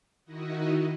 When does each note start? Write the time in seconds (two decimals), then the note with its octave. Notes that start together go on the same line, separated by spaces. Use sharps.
0.24 D#3 D#4 E4 F#4 D#5